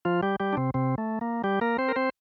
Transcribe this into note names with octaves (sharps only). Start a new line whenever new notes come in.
F3 F4
G3 G4
G3 G4
D4
C3 C4
C3 C4
A3
A#3
G3 G4
A#3 A#4
C4 C5
A#4
C4 C5